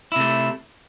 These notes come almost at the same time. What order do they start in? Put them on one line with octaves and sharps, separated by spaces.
E4 C3 A3